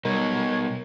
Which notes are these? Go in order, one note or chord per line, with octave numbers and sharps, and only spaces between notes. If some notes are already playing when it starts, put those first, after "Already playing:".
B2 G3 D#4 A#4 C#5